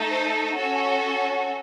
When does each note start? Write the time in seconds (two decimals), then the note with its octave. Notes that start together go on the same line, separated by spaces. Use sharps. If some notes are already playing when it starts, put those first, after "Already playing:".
Already playing: A3 D#4 A4
0.10 C5
0.57 C#4 F#4 A4 C#5